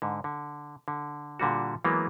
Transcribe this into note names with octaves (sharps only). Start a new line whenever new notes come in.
G#2 D3
D3
D3
A#2 D3 G3 F#4
E3 F#3 G#3 A#3 B3